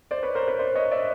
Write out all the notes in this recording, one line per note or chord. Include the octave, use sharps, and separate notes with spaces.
C5 D5
B4 C#5
A#4 C5
B4 C#5
C5 D5
C#5 D#5
D5 E5